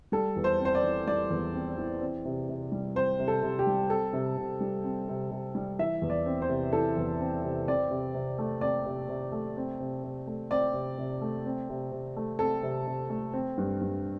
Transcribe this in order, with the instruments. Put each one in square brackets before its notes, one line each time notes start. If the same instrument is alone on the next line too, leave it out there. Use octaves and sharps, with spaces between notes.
[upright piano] G3 A4
E2
C5
C4
C5
D5
E3
G3 D5
E2
C4
E3
C4
C3
C3
G3
C4 C5
C3
A4
C3
G4
G3
C4 A4
C3
C3
G3
C4
C3
C3
G3
E3 E5
E2
D5
C4
C5
C3
E3 A4
E2
C4
C3
C4 D5
C3
C3
A3
C4 D5
C3
C3
A3
C4
C3
C3
A3
C4 D5
C3
C3
A3
C4
C3
C3
A3
C4 A4
C3
C3
A3
C4
G2
G2